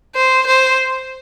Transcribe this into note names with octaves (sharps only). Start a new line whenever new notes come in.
C5
C5